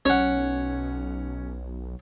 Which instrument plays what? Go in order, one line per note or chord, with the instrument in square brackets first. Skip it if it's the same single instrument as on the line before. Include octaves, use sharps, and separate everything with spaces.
[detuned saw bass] B1 [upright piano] C#4 [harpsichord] C#5 F#5